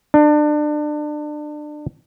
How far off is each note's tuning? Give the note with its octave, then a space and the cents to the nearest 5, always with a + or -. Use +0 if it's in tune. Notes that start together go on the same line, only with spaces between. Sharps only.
D4 +30